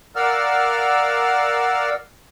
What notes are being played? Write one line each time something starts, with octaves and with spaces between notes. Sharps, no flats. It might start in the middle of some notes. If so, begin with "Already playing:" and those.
A#4 D5 F5 F#5 E6 F6